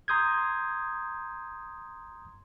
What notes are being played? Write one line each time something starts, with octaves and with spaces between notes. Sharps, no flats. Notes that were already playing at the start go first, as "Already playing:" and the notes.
A#5 C6 D#6 G6 G#6